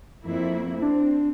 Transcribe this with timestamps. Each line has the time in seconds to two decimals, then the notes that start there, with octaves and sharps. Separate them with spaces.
0.23 F2 A#3 E4
0.82 C4 D4